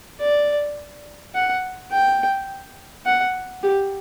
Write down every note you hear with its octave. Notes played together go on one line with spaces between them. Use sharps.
D5
F#5
G5
F#5
G4